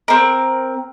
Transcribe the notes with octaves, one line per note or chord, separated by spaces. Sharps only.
C4 A#4